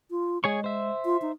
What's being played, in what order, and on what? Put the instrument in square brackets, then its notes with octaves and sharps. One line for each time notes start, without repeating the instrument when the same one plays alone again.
[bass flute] F4
[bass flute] G#3 [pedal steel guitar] G#4 C#5 C#6
[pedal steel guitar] C5 E5
[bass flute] F4
D#4